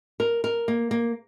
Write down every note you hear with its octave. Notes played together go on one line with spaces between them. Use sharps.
A#4
A#4
A#3
A#3